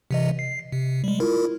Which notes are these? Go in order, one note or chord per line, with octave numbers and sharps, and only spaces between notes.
C3 E3 D#5
C7
C3
G3 G#3
E4 F4 A#4